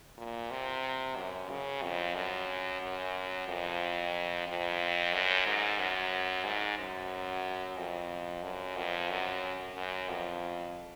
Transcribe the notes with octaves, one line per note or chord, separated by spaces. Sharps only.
A#2
C3
F#2
C#3
F2
F#2
F#2
F2
F2
F#2
G#2
F#2
G#2
F#2
F2
F#2
F2
F#2
F#2
F2